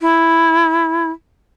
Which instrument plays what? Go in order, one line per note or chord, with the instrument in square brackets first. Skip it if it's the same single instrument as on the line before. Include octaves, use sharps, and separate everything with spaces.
[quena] E4